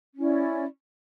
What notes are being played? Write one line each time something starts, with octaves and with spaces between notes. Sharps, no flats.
C#4 E4 D5